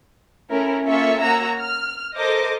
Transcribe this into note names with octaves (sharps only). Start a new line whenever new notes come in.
A3 C#4 E4 A#4
A#3 C#4 F4 A4 E5 C#6
A#3 F#4 C#5 A#5 E6
F6
A4 A#4 C5 D#5 D6